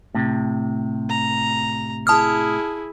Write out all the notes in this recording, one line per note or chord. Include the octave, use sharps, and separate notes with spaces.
A2 C3
A#5
E4 G#4 A5 D#6 F6